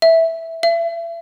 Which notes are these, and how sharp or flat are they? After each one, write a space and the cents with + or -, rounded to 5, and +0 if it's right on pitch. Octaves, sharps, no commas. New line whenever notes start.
E5 -5
E5 +35